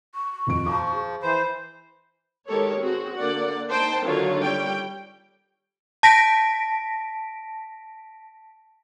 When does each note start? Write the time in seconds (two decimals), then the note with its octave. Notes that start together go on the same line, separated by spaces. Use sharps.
0.15 C#6
0.47 D#1 F2 D7
0.66 F3 A5 A#5 D6
0.93 G#4
1.23 E3 C5 B5
2.48 D#3 G#3 G4 A4 A#4 C#5
2.80 C4 F#4 G#4
3.14 D3 A#3 D5 F#5
3.70 D#4 C5 G5 A5
4.04 D3 D#3 F#3 F4 C#5
4.41 G3 C#5 G5
6.03 A5 A#6 B6 D7